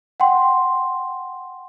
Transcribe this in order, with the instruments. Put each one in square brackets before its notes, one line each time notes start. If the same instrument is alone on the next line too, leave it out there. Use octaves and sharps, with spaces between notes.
[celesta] F#5 G5 C6